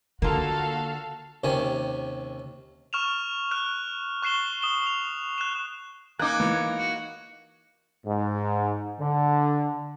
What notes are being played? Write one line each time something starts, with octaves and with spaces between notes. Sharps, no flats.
D3 A#3 F4 F#4 A4 F5
D#2 C3 D#3 C#4 C#5 G#5
C#6 F6 E7 F7
F6 F#6
C#6 F#6 C7 E7 G7
D#6 E7 G7
D#6 F7
F#6 E7
A#3 D#4 G#5 D6 F#6
E3 C#5
F#4
G#2
D3